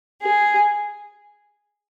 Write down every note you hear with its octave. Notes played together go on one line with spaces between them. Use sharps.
G#4